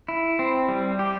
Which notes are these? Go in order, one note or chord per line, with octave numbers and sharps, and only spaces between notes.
E4
C4
G3
G4